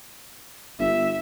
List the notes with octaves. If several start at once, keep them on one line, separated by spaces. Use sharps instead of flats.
G1 E5